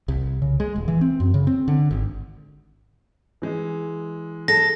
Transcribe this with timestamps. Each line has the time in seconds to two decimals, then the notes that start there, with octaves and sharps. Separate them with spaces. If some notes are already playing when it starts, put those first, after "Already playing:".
0.08 C2
0.42 C#3
0.60 G#3
0.76 D#1
0.88 E3
1.01 C4
1.20 F#2
1.34 C#3
1.47 C4
1.68 D3
1.91 G#1
3.42 E3 G#3
4.48 A4 A#6